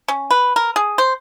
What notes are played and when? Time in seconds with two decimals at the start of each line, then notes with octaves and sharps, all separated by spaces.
0.08 C#4
0.31 B4
0.56 A#4
0.76 G#4
0.98 C5